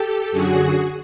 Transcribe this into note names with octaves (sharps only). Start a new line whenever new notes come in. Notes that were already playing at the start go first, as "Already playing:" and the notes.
Already playing: G4 A4
F#2 D3 F#3 F#4 G#4